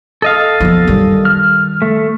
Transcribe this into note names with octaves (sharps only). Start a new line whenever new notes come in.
A4 D#5 F5
F3 B3
D#3 G3
F6
A3